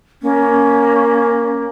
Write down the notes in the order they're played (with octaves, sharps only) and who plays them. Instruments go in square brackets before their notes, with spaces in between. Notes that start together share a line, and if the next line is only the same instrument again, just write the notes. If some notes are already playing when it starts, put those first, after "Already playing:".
[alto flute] A#3 [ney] C#4